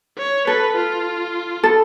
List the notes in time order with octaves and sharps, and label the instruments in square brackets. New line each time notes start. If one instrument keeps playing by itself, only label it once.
[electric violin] C#5
[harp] A4 [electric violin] B4
[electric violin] F4
[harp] A4